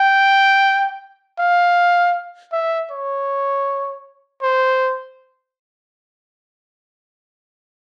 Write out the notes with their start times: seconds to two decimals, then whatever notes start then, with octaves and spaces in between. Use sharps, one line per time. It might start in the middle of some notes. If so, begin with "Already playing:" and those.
Already playing: G5
1.39 F5
2.53 E5
2.91 C#5
4.42 C5